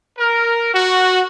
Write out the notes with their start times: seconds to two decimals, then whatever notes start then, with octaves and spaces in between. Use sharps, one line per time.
0.18 A#4
0.73 F#4